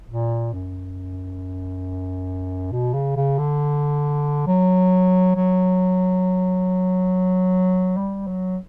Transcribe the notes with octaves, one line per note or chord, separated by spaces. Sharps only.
A#2
F#2
B2
C#3
C#3
D3
F#3
F#3
G3
F#3